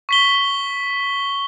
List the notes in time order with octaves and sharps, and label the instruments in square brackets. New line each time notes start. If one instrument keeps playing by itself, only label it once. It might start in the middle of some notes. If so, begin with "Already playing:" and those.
[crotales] C#6 B6 G7